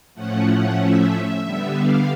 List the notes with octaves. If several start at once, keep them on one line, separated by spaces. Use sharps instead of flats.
A2 F3 A3 C#4 F#5
F#5
E5
D3 G3 B3
F5